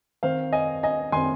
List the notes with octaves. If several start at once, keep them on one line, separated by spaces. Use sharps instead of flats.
D#3 C4 C5 F5
D#5 G#5
D#5 G#5
D#3 C4 G#5 C6